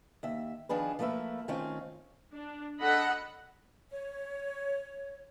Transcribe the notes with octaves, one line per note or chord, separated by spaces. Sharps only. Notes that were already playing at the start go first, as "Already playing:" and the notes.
D#2 E5
D#3 F3 D4 G#4 B4
F3 A3 A#3 B4 E5
D#3 A3 C4 C#4 F4
D4
D4 A4 D#5 F#5 B5
C#5